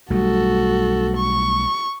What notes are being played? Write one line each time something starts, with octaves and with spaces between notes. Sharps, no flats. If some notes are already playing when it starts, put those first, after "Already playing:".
B1 G3 A3 F#4 A4
C#6